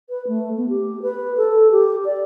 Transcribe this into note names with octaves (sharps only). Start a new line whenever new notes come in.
B4
A3
B3
G4
B4
A4
G4
D5